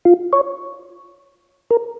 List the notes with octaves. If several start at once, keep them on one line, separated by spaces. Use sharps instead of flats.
F4
C#5
A#4